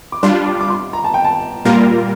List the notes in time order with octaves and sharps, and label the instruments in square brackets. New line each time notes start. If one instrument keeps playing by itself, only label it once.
[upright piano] D6
[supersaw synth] G3 D4 F4 [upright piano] C6
[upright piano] D6
D6
C6
A#5
A5
G5
A5
[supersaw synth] A#2 G3 A#3 F4 A#4